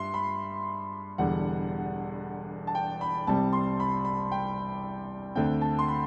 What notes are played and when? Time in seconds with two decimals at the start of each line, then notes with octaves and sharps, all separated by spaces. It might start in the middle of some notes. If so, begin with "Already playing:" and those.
Already playing: G2 G3 E5 C6
0.14 B5
1.18 E1 E2 D3 G3 F#5
2.67 A5
2.75 G5
3.01 B5
3.27 C2 C3 G3 C4 A5
3.53 C6
3.80 B5
4.05 B5
4.32 G5
5.35 D2 D3 A3 C4 G5
5.61 A5
5.79 C6
5.88 B5